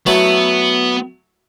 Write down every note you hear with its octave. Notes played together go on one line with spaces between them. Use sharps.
F#3 A3 B3 E4